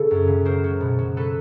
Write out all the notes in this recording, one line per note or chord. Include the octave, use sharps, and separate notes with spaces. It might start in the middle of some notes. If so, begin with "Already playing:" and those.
Already playing: C#3 A4
F#2
C#3
F#3 A#4 C5
F#3
B2
F#3
F#3 A4 B4